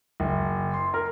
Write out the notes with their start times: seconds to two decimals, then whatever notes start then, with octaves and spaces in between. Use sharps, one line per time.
0.20 F#1
0.74 C6
0.94 A#4